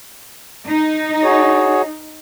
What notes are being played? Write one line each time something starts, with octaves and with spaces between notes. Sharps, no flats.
D#4
F#4 G#4 C#5